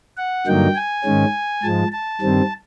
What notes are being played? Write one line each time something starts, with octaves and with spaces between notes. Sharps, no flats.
F#5
G2 D3 F#3 A#3 D#4 G5
G#5
G#2 D#3 G#3 C#4
G#2 F3 G#3 A5
A5
G2 D#3 G3 C4